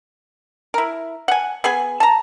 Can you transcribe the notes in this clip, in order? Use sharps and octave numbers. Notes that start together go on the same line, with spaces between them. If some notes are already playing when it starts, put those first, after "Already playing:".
E4 A#4
F#5 G#5
B3 G#4 G#5
A5 A#5